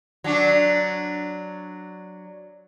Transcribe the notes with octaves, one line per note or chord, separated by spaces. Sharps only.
F#3 D4